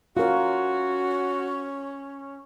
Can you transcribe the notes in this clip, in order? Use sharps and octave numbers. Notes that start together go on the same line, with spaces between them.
C#4 F4 F#4 A#4